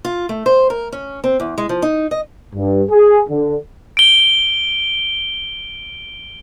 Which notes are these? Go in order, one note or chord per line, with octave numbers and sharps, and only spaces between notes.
F4
A3
C5
A#4
C#4
C4
E2
G#3
F3
D#4
D#5
G2
G#4
D3
D7 G7